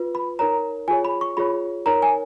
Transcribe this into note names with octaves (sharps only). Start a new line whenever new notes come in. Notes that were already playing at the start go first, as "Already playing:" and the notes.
Already playing: F4 B4
B5
D#4 A#4 C#5 A#5
F4 G#4 C#5 G#5
B5
C#6
F4 G#4 C#5 B5
D#4 A#4 C#5 A#5
G#5